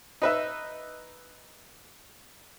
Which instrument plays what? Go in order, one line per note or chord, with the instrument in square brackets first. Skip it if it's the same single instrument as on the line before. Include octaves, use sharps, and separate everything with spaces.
[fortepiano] D#4 B4 E5